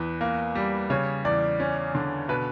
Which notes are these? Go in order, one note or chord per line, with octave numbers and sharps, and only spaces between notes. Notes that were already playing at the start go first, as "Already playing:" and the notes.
Already playing: E2 B4
A#3
G3
C#3 C#5
E2 D5
C#4
D3
B2 B4